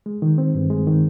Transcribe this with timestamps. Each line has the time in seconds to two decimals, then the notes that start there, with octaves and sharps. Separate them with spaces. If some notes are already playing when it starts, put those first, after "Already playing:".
0.06 G#3
0.22 D#3
0.38 C4
0.55 G2
0.70 G#3
0.87 D#3